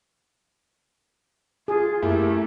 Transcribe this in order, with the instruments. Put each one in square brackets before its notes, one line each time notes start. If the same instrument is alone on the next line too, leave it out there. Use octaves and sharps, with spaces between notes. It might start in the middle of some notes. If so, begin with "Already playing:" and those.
[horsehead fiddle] F4 [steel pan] G#4
[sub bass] F#2 [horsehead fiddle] A3 [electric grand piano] A#3 E4 G4